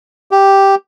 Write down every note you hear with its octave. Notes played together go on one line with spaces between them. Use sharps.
G4